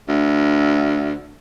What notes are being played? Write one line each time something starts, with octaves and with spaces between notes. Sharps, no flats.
D2